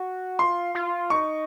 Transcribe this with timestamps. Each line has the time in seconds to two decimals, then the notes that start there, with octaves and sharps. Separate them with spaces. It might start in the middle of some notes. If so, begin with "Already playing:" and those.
Already playing: F#4
0.39 F4 C6
0.75 F4
1.10 D#4 C#6